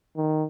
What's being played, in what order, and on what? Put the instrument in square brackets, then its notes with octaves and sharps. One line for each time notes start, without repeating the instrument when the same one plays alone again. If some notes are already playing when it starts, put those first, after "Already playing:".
[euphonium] D#3